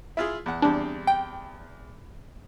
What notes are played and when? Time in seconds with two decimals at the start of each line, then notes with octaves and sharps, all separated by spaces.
0.17 E4 F4 G#4
0.46 E2 F#5
0.62 E2 G3 C4 D4
1.07 G5